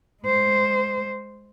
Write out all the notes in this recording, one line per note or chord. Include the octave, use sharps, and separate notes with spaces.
G#3 C5